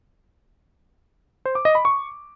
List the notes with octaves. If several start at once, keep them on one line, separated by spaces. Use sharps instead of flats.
C5
D6
D#5
B5
C#6